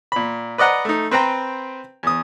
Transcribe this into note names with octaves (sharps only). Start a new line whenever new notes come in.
A#2 B5
B4 D5 D#5 F#5 A#5
A3 D#4
C4 B4 C5 G5 A#5
E2 D#6